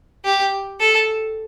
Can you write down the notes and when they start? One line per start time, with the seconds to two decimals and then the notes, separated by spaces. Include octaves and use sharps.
0.25 G4
0.80 A4